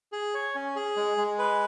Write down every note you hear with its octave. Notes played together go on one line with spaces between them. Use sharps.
G#4
C#5
C#4
G#4
G#3
G#3
B4